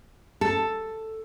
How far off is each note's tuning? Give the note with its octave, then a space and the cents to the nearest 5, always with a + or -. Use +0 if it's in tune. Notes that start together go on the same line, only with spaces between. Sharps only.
A4 +5